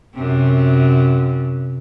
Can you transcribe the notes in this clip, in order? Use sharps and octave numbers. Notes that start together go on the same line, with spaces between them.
F#2 C3